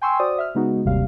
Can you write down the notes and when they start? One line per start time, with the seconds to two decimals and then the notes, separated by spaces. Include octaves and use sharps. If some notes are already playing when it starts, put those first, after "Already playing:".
0.02 G5 G#5 C6 C#6 E6
0.19 F#4 C5 D5 D#6
0.38 E5 F6
0.55 C#3 G#3 B3 D#4 F#4
0.85 G1 D#2 C3 G3 F5